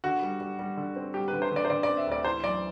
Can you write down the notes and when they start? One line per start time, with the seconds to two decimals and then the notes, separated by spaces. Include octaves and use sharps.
0.04 D3 F#4
0.22 G3
0.41 G3
0.59 G3
0.77 D3
0.96 C4
1.14 G3 G4
1.28 D3 B4
1.42 C5
1.51 D3 D5
1.65 C5
1.70 D3 D5
1.83 D5
1.88 C4
1.97 E5
2.07 D2 D5
2.24 E3 C5
2.43 F#2 D5